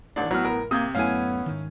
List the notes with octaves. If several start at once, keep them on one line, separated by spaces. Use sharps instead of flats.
E1 A1 D#2 D4
A1 A2 F#3 B3 F6
A#4
C3 A#3 D#6 G6 G#6
D1 F#2 A3 B3 C#4 E4 F5 G#5
G#2 D#3